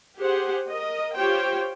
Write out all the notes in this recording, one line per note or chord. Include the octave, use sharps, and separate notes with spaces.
G4 G#4 C5 F#5
A#4 D#5
F4 G4 C5 C#5 G5